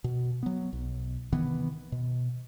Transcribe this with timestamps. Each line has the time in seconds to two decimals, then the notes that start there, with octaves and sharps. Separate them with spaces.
0.04 B2
0.43 F#3 B3
0.73 B1
1.33 C3 D#3 E3 B3
1.92 B2